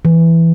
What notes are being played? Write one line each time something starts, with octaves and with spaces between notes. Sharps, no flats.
E3